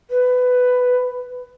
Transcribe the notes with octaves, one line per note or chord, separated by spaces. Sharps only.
B4